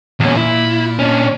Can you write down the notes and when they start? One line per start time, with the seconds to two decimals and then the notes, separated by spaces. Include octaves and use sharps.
0.20 E2 A#2 C#4
0.37 E4
0.99 C#4 D4